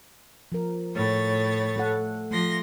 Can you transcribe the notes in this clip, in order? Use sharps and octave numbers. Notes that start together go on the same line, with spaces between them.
F3 A#4
A2 C#5 A6
A3 A4 F#5
F3 A3 C6 A#6